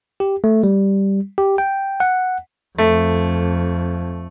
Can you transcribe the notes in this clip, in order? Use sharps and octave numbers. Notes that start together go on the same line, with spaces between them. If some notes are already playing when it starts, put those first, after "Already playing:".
G4
A3
G3
G4
G5
F#5
F2 A3